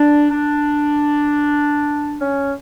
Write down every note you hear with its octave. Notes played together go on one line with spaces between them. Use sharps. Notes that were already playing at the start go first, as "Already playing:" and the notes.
Already playing: D4
D4
C#4